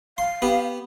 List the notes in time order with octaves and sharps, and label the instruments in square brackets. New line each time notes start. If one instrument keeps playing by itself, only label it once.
[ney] F5 [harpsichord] C6
[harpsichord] B3 G4